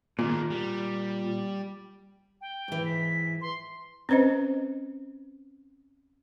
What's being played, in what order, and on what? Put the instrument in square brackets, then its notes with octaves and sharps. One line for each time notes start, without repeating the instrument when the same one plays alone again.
[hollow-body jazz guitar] A#2 [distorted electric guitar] D#3 G#3
[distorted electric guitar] G3
[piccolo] G5
[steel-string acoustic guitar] G#2 E3
[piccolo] B6
C6
[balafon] C4 C#4 B4 C5 D#5